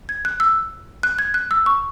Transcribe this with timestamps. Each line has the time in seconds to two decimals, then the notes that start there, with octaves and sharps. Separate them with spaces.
0.09 G#6
0.25 F#6
0.40 E6
1.03 F#6
1.19 G#6
1.34 F#6
1.51 E6
1.66 C#6